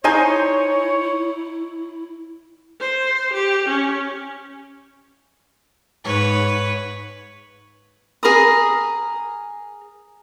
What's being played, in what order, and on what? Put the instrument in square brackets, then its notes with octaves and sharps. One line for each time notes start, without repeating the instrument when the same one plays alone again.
[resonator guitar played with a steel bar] D#4 C5 G#5 [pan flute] E4 [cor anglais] C#5
[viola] C5
G4
C#4
[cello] G#2 [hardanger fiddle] B4 C#5
[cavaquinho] G#4 A#4 B5 D#6